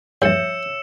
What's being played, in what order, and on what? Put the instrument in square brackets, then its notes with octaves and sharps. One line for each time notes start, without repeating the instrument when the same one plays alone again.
[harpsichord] A#1 G2 [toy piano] C#5 E5 [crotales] E6 C#7 E7